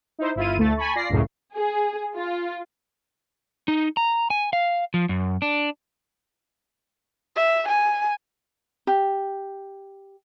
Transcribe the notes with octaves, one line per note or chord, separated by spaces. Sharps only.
D#4 E4 C5
G1 E4 F4 D#7
D2 A3 A6
G#5 A5 B5 C#6
F4 D5 A#6 C7
C#2 F#2 A2 C#3
G#4
F4
D#4
A#5
G#5
F5
F3
F#2
D4
E5
G#5
G4